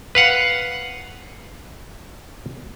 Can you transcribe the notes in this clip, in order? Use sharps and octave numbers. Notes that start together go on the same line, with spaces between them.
B4 F5 F#5